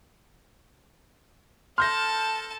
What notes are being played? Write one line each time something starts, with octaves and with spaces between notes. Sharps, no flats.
A4 A5 C6 F6 G6 A#6